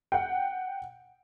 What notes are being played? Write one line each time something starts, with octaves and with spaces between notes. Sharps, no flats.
F#5 G5